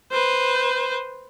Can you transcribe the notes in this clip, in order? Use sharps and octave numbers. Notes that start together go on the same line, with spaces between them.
B4 C5